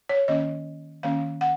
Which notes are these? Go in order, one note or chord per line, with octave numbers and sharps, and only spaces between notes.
C#5
D#3 A#3 C#4 D#5
D#3 A#3 C#4 F5
F#5